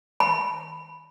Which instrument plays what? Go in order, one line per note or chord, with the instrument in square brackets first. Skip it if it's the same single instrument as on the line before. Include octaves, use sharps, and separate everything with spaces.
[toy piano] B5